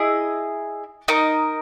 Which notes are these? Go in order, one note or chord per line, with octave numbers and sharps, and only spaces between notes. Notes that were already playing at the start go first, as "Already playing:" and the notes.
Already playing: E4 G#4 D#5
D#4 A#4 D#5